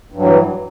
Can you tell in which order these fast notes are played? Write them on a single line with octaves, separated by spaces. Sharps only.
G2 F#3 E3